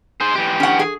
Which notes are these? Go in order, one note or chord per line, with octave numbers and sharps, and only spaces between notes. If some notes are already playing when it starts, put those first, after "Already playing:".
G#4 C5
E3 G4
C#4 F#5
G#4